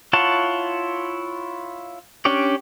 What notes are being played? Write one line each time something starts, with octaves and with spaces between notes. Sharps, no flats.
E4 F4 C#5 F#5 A5
C#4 D4 G4 C#5 D5